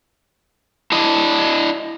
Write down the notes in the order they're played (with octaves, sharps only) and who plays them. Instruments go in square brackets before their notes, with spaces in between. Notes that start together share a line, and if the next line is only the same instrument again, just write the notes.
[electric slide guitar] D4 E4 D#5